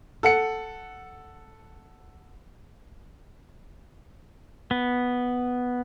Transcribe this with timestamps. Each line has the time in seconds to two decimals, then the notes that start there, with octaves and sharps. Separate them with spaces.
0.23 A4 F#5 C#7
4.71 B3